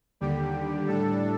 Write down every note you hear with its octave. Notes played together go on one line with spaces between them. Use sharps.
D#2 D3 G3 G4
A2 G3 D4 A4